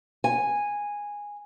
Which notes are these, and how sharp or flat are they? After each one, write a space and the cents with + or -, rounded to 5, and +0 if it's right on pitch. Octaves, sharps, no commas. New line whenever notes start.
G#5 -10